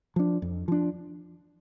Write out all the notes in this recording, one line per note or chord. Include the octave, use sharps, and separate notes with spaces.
F3 D4
F2
F3 D4